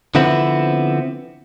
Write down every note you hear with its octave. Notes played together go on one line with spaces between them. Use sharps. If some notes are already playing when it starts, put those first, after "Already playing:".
D3 F3 B3 C4 E4